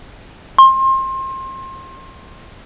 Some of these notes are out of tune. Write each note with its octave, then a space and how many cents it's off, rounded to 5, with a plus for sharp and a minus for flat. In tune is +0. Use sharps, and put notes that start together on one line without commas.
C6 +30